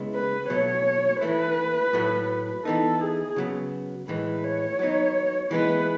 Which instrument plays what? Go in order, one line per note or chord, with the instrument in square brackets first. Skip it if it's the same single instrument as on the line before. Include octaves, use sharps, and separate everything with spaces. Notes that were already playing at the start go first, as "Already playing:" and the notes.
Already playing: [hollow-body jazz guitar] C#3 G#3 B3 E4
[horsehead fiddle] B4
[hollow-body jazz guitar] B2 F#3 A3 [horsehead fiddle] C#5
[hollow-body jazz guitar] E3 A3 E4 [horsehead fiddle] B4
[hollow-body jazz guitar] A2 F#3 A3
[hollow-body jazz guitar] E3 B3 D#4 [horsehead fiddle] A4
[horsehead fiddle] G#4
[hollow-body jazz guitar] C#3 F#3 B3
[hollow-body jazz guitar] A2 E3 G#3 [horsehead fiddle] B4
[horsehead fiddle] C#5
[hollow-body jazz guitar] F#3 B3 D#4
[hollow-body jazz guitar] E3 G#3 B3 [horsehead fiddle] B4